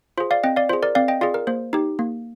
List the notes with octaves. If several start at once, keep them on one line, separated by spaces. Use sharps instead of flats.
F4 G#4 C5
D5 F5
C4 D#5 G5
D5 F5
F4 G#4 C5
A#4 D5
C4 D5 F5
D#5 G5
F4 G#4 D5 F5
A#4
A#3 C5
D#4 G4
A#3